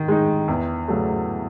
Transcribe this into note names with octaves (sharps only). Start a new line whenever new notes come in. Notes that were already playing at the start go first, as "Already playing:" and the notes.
Already playing: D#3
G#3 D#4
E2
C#3 F#3 A3